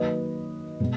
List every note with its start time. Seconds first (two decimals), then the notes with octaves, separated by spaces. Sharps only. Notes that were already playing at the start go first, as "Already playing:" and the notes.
Already playing: D#3 F#3 A#3 B4 D#5
0.80 B2 G#3